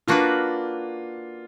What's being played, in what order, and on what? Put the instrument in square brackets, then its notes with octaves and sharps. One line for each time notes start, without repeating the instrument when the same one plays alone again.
[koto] A#3 D4 F#4 B4 [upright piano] F4